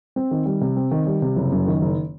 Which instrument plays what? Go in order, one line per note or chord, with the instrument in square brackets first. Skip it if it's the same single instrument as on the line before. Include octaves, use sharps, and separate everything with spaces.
[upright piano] C4
D#3
G3
C3
C4
D#3
G3
C3
F#1
F#2
D#3
F#1